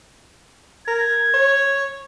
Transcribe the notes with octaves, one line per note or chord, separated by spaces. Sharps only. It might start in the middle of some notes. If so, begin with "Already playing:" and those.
A#4 G#6
C#5